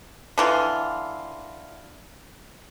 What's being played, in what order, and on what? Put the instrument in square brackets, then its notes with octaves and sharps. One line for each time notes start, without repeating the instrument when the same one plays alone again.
[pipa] D3 E3 F4